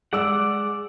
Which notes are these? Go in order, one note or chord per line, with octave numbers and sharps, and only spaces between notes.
G#3 D5 F#5 E6